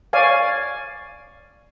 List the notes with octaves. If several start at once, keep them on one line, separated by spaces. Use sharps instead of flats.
C#5 D5 F5 G#5